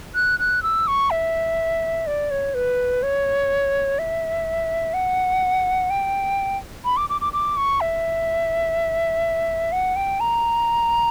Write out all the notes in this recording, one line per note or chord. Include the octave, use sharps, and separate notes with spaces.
F#6
F#6
E6
C#6
E5
D5
C#5
B4
C#5
E5
F#5
G5
B5
D6
D6
D6
D6
C#6
E5
F#5
G5
A#5